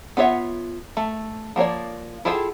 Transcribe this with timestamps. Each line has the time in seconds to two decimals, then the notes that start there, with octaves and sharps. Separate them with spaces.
0.17 B3 F4 C#5 E5
0.97 A3
1.56 F3 A#3 C#5 D5
2.25 E4 F4 G#4 A4 G5